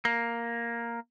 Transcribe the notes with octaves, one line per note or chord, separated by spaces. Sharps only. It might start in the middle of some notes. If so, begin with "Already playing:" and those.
A#3